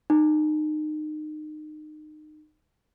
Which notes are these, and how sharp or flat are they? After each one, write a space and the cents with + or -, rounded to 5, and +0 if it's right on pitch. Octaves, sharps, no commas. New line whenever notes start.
D#4 -25